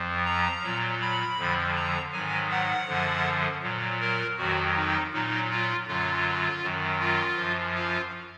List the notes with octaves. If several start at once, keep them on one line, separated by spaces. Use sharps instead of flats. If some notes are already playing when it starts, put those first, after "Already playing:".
Already playing: F2 F3
A#5
A#2 F#3
B5
F2 D3 F3
A#5
G#2 D#3 F#3 G#5
F#5
F#2 D3 F3
A#2 F#3
A#4
F2 D#3 F#3 F#4
D#4
A#2 F#3 D#4
F4
F#2 D3 F#3 F4
F#2 D#3 F#3
F4
F#2 F3
F4